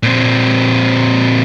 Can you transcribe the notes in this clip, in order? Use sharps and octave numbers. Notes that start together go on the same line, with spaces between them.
A#2 C4